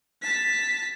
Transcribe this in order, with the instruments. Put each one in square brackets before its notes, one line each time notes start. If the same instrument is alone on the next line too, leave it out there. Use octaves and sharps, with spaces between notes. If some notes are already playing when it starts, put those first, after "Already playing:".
[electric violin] A5 B6